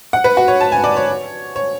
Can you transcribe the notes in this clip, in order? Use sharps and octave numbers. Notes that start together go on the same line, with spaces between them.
F#5
B4
F#4
C#5
A5
G#5
D5
C#5
C#5